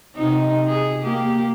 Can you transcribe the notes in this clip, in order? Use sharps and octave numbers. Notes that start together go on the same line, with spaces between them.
C3 D#4
G#4
A#3 G4